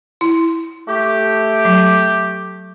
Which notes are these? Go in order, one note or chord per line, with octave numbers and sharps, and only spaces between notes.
E4
A3 G4
F#3